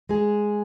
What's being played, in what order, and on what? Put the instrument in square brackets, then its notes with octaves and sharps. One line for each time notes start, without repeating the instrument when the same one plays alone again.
[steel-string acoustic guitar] G#3 G#4